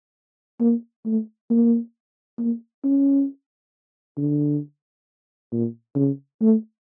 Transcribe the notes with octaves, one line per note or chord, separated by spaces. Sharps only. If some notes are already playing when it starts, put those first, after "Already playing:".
A#3
A3
A#3
A#3
C#4
D3
A#2
C#3
A3